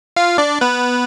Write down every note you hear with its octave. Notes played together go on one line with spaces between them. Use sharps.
F4 F5
D4 D5
B3 B4